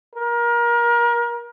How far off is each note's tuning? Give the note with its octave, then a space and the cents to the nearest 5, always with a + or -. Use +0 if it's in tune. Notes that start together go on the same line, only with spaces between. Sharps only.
A#4 +30